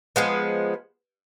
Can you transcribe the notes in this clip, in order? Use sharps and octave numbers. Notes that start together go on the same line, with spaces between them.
F3 G#3 B3